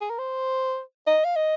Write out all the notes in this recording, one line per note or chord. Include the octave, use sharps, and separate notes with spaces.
G#4
A#4
C5
D#5
F5
D#5